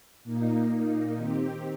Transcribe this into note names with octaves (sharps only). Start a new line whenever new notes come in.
A#2 A#3 D#4
D#3 C4 G4